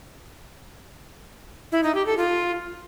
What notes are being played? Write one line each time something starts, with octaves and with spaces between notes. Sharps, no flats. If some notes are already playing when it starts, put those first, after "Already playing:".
E4
D#4
G4
A4
F4